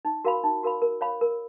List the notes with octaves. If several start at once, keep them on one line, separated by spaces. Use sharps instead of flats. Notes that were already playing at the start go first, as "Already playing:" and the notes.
D#4
F#4 A#4 F5 B5
D#4
F#4 A#4 F5 B5
A#4
C#5 F5 B5
A#4